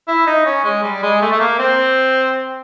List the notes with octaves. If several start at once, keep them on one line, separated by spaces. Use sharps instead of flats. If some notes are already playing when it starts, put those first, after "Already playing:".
E4
D#4
C#4
G#3
G3
G#3
A3
A3
A#3
C4